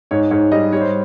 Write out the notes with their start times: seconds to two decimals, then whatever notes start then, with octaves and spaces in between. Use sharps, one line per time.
0.11 G#2 C#5
0.31 G#2 C#5
0.52 G3 D#5
0.72 G3 C#5
0.81 C5